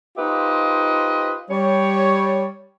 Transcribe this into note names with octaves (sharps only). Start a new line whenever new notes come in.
D#4 F4 G4 B4 C5 D#5
G3 C#5